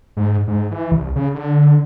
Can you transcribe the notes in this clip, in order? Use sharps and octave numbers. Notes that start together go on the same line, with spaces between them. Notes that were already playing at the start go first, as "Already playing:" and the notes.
G#2
G#2
E3
C2
C#3
D3